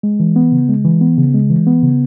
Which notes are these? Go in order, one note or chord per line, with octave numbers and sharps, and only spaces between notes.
G#3
E3
B3
C#3
G#3
E3
B3
C#3
G#3
E3
B3
C#3